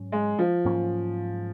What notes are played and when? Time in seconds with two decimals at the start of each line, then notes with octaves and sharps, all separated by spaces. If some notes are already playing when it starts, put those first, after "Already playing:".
Already playing: G#2 F#3 C#4
0.12 G#3
0.39 F3
0.65 G#2 F#3 A#3 C#4